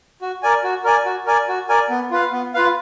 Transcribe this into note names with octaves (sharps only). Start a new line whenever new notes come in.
F#4
A#4 D5 G#5
F#4
A#4 D5 G#5
F#4
A#4 D5 G#5
F#4
A#4 D5 G#5
B3
F4 B4 F5
B3
F4 B4 F5